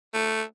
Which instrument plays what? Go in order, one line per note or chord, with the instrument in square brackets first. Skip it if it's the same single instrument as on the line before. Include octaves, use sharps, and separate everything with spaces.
[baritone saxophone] A3